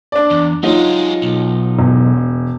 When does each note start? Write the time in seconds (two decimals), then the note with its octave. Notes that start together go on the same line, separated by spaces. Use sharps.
0.12 D4 D5
0.30 E2
0.63 F3 F#3 G#3 D#4 F4
1.22 B1
1.79 E1